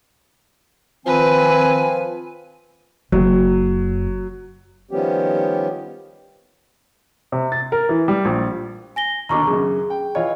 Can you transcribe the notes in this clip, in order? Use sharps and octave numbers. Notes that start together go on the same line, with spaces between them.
D#3 F3 C4 B4 G#5
F#1 F#3
D#3 F3 G3 B3 C#4 G4
C3
A6
A#4
E3
G3
A#1
G#5 A#6 G7
D#2 B2 D3 A#5 C#6 D6
F#2 C#3 G#4
G5
E3 F4 C#5 D#5